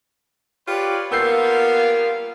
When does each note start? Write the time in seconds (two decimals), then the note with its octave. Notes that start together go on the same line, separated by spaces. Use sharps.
0.68 F4 G4 B4 C#5 D5
1.12 G3 A#3 B3 F4 E6 G6 C7